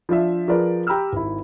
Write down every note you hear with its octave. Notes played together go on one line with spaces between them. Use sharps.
F3 D4 F4 E5
F3 F4 G#4 A#4 B4 D5
G4 G5 A#5 B5 E6 F6
G#1 E4